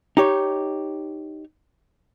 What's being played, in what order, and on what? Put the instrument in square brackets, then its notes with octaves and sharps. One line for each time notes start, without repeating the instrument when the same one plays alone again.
[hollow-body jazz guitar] D#4 G4 C#5